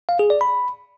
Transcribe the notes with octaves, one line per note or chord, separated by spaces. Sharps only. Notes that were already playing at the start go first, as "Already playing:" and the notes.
F5
G#4
D5
B5